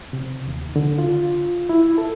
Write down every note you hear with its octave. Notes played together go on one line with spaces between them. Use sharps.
C3
D#2
D3
F4
E4
A4